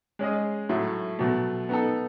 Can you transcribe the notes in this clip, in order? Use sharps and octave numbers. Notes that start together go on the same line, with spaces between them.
G#3 C#4 G#4 D#5
A2 F#3 A3
B2 F#3 A3
B3 D#4 A4